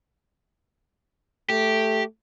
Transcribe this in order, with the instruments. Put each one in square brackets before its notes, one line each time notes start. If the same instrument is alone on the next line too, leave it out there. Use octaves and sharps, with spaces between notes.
[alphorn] A3 [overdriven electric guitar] G4